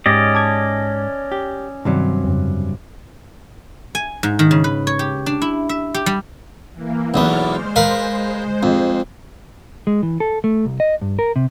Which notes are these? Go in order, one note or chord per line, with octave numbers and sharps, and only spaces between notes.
G#2 C#4 G4 D5 D#5
A5 D6 G#6
G4
G2 C3 D#3 F#3
F2 C#3
G#5
G#2
D#3
C#3
B4
C#5
G4
D4
E4
E5
G4
G3
E3 A#3
B1 E2 B3 C#5 D5 F6
G#3 C5
A#4 B4 F5
F2
G#3
E3
A4
A3
C2
D#5
G2
A#4
C3